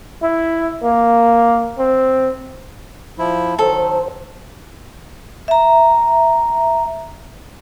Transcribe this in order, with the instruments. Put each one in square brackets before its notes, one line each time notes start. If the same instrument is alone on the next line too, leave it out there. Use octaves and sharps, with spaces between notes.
[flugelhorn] E4
A#3
C4
[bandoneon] F3 E4
[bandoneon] D#3 F#3 [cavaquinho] A4 [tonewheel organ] C5
[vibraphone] E5 A#5